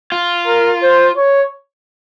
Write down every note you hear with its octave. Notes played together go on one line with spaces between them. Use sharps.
F4
A#4
C5
C#5